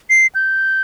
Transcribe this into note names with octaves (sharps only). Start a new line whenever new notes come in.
C7
G6